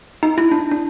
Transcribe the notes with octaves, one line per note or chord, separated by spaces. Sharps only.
D#4
E4
D4
D4